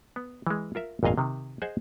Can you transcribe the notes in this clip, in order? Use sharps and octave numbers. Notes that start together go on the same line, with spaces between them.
B3
E3 G#3
F4 A#4 E5
G#1 F2 A#2 D#5 F5 G#5
C3 D#3
G#4 C5 D#5 F#5 G#5